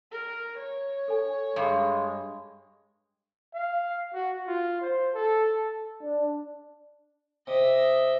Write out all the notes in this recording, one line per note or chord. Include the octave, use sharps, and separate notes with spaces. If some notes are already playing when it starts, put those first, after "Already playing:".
A#4
C#5
A4 G#5
G2 G#3
F5
F#4
F4
C5
A4
D4
C3 D#5 E5